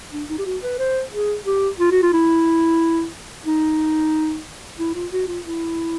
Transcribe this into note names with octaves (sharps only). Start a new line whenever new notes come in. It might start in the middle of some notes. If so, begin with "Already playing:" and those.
D4
D#4
G4
F#4
B4
C5
G#4
G4
F4
F#4
F4
E4
D#4
E4
F4
F#4
F4
E4